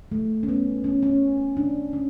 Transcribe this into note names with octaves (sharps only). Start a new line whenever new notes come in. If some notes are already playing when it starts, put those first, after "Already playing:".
A3
C#4
B3
C#4
C#4
D4
C#4